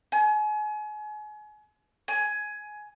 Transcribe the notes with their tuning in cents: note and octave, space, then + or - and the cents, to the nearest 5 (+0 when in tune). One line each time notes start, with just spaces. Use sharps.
G#5 +35
G#5 +15